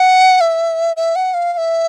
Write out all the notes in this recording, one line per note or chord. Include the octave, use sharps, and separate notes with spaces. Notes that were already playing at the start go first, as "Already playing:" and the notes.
Already playing: F#5
E5
E5
F#5
F5
F5
E5